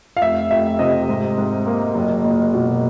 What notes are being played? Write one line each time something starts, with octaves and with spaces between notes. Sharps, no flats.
F5
F1 E5
F1 E5
C3 D#5
G#2
G#2
A#3
F#1
F#1
B2